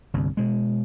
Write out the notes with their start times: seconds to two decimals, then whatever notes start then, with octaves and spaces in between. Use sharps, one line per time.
0.14 G1 C2
0.37 B2 G#3